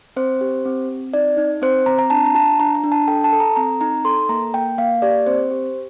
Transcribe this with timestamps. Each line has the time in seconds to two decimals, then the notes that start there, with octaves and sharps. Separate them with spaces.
0.16 C4 C5
0.41 G4
0.65 C4
0.89 C4
1.14 D#4 D5
1.37 D#4
1.62 C4 C5
1.86 C4 A#5
1.99 A#5
2.10 D4 A5
2.26 A#5
2.35 F4 A5
2.60 D4 A#5
2.75 A#5
2.84 D4
2.92 A5
3.08 A4 G5
3.24 A5
3.33 A4
3.40 A#5
3.56 C4 A#5
3.81 D#4 A#5
4.05 A4 C6
4.29 A#3 A#5
4.54 A#3 G5
4.78 A#3 F5
5.02 G4 D5
5.26 C4 C5
5.51 G4